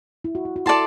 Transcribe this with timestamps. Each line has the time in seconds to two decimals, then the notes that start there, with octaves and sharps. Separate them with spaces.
0.24 E4
0.35 F#4
0.45 E4
0.56 F#4
0.66 E4 A4 D5 A5 C6